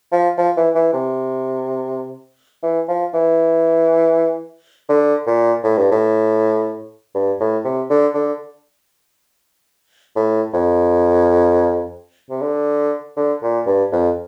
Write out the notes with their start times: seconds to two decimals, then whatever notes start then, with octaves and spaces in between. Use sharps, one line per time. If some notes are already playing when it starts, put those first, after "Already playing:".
0.12 F3
0.37 F3
0.56 E3
0.75 E3
0.93 C3
2.63 E3
2.88 F3
3.13 E3
4.89 D3
5.26 A#2
5.63 A2
5.77 G2
5.91 A2
7.15 G2
7.40 A2
7.64 C3
7.90 D3
8.15 D3
10.16 A2
10.53 F2
12.30 C3
12.42 D3
13.16 D3
13.42 A#2
13.66 G2
13.92 F2